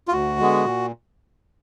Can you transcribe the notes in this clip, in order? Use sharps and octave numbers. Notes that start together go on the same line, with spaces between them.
F4
D2 F#4
D3 G#3 B3
A#2